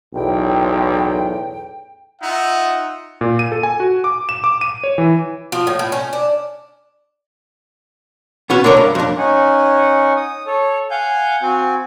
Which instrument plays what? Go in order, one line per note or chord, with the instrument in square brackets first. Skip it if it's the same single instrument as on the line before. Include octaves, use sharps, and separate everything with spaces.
[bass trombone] B1 [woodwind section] E2 A2 G5
[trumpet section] D#4 F4 E5 F#5
[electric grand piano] A#2
D#7
A4
G#5
F#4
D6
E7
D6
D#7
C#5
E3
[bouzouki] F3
A2
A2
C#4
D4
[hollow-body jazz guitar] B3 C#4 F#4
D3 D4 A#4 C#5
G2
F2 D4
[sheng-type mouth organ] C#4 D#4 F#5 G#5
D#6
A4 C#5
F5 F#5 G#5 G6
C4 F#4 G#5